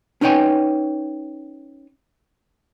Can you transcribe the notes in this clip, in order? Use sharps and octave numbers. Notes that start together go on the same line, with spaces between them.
C#4 D#4 B4 C#5 G5 G#5